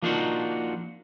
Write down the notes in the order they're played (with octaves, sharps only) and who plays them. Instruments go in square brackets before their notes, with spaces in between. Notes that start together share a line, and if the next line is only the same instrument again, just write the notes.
[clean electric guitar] F3 A#3 D4 D#4 F4 F#4